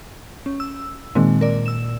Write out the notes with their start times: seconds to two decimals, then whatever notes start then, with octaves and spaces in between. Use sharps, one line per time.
0.46 C#4
0.60 E6
1.15 A#2 D#3 G#3 C4
1.41 A#4 D5
1.66 E6 E7